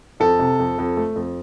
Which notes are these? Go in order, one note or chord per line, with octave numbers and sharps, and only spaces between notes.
F2 A4
C3
F2
F2
A3
F2